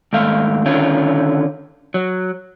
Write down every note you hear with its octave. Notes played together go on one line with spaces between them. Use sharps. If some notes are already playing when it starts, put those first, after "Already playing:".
D#2 G#2 A3 F5
D3 D#3 C#4 F4
F#3